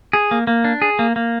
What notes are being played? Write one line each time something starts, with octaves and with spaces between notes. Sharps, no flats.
G#4
A#3
A#3
D4
G#4
A#3
A#3